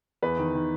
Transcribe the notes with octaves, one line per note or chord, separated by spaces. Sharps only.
E2 B4
D#3
D#3